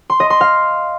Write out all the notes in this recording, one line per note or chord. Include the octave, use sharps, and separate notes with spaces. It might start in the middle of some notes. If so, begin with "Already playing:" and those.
C6
D#5
C6
F5